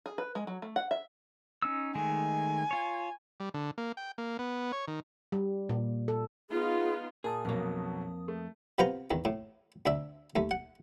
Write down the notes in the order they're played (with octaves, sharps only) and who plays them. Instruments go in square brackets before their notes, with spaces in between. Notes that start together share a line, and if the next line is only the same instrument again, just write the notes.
[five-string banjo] G#4
B4
G#3
F#3
A3
F#5
E5
[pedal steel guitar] C#4 D#4 E6
[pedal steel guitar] D#3 G#3 A3 [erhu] G#5
[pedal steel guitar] F4 C#5
[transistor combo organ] G3
D3
A#3
G5
A#3
B3
C#5
D#3
[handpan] G3
A#2
A4
[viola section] B3 D#4 F4 [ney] G#4
[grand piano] A#2 [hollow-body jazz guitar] G#4 [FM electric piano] A#4 A5 D#6
[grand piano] B1 B2 F#3 [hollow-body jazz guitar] F2 A#3
[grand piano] A3
[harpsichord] C3 B3 F4 C5 A#5
E2 D#3
A2
D2 D4 E5
D#2 A3
F#5